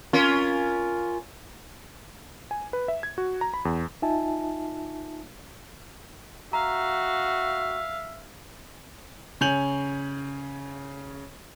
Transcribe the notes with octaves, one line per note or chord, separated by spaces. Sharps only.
C#4 F4 A#4
G#5
B4
E5
G#6
F#4
A#5
B5
E2
D#4 F4 E5 G#5 A5
F#4 E5 F5 A#5
C#3 C#5 G#5 G6 F7 F#7